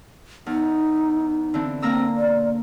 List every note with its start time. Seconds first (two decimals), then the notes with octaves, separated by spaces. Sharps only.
0.46 E2 D#4
1.54 D3 E3 C4
1.82 A#3 C4 A#5 E6
2.17 D5